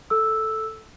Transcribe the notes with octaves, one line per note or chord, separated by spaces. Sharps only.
A4 E6